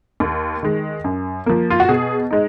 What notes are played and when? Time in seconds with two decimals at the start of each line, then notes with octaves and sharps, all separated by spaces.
0.20 D#2
0.63 D#3 G#3
1.04 F#2
1.46 F3 A#3
1.70 F4
1.80 F#4
1.89 B2 G#4
2.31 G#3 D#4